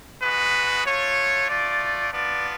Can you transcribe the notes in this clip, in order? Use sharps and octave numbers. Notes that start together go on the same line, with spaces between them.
G#3 B3 F#4 B4
A3 F4 C#5
A3 F4 D5
B3 D4 F4 D5